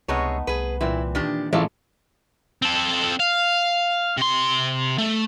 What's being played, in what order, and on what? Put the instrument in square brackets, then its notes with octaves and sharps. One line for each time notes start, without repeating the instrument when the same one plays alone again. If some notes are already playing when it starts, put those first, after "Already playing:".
[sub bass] C#2 [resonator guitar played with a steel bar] C3 G#4 C#5 [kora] A3 B3 D#4
[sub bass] C2 [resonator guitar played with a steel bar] G#4 B4
[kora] A#2 E3 C4 [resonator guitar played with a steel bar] E4
[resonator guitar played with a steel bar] D#3 D4 G4
[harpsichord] A1 [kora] A#2 G#3 A3 [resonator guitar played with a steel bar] E4 D5 F5
[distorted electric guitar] C4 A4
F5
C3 C6
A3